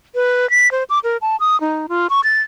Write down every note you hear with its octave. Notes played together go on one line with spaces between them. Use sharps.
B4
B6
C5
D6
A#4
A5
D#6
D#4
F4
C#6
A6